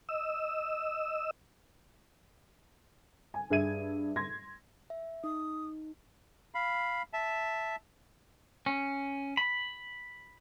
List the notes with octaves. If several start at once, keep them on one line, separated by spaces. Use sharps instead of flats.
D#5 E6
G#5
G2 G#4 E5 G#6 D#7
C6 G#6 A#6
E5
D#4 D#6
F5 B5
E5 A5
C#4
B5